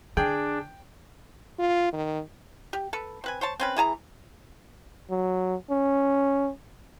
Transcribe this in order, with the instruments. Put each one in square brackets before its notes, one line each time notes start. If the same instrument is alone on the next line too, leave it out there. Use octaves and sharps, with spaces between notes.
[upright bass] D3 [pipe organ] D4 [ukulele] G#4 [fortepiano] G5
[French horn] F4
D#3
[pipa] G4
A4 B4
C4 B4 G#5
C5 C#5 A5
C4 C#4 B4
E3 G#4 A5 A#5
[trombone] F#3
C#4